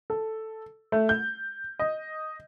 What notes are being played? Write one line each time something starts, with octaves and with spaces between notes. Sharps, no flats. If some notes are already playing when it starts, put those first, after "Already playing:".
A4
A3
G6
D#5